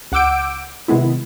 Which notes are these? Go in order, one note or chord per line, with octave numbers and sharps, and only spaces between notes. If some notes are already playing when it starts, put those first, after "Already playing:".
C#2 F#5 D6 E6 G6 D7
C3 D#3 G#3 B3 E4